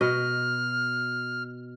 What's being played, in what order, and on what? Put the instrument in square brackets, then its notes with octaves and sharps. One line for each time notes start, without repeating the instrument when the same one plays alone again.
[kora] B2 D#5 [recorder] F6